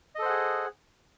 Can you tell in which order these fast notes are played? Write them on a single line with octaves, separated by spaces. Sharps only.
D#5 A4 C5 F#5 G#4